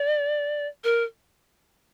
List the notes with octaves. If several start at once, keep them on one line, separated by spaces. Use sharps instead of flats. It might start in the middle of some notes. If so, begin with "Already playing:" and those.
Already playing: D5
A#4